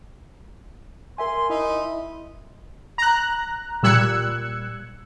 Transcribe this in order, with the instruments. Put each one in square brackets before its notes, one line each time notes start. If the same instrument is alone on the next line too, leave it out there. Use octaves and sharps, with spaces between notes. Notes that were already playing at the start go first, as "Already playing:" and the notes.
[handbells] A#4 E5 G#5 [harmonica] C6
[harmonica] D#4 [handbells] E4 E5 C6
[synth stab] A#5 F#6
A#2 G3 E6 F#6 G#6 C#7